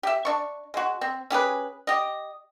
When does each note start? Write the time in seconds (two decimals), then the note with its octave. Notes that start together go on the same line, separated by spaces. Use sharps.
0.03 G4 E5
0.25 D4 C#6
0.74 G#3 F#4
1.01 C4
1.30 C#4 G4 G#4 B4
1.87 G4 D#5